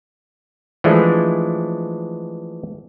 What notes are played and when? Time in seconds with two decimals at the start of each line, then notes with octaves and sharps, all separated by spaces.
0.84 E3 F3 G#3 A3 D4